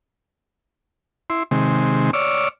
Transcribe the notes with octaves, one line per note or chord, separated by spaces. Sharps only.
E4 C6
C3 D#3 G#3 C4
C#5 D5 D6 E6 F6